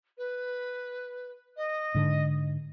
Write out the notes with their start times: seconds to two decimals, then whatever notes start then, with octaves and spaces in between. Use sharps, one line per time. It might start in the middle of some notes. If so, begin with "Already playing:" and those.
0.18 B4
1.57 D#5
1.95 G#2 D3